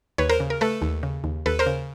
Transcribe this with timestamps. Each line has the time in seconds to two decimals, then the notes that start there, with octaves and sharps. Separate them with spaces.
0.18 D#2 B4 C#5
0.29 A#4 C5
0.40 C#3
0.50 A#4
0.61 A3 A4 B4
0.82 D#2
1.03 C#3
1.24 D#2
1.46 D#2 A4 B4
1.59 A#4 C5
1.66 C#3